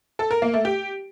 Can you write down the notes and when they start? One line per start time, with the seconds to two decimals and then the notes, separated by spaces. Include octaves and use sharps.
0.19 A4
0.31 A#4
0.42 A#3
0.53 A3
0.65 G4